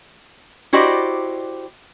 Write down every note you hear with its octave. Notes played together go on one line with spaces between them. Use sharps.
E4 F#4 G4 C5 D5 D#5